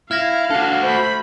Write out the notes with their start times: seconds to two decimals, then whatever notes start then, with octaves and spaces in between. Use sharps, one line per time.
0.11 E4 F5 F6 G#6 A#6
0.50 D4 F#4 A4
0.83 A3 C5 B5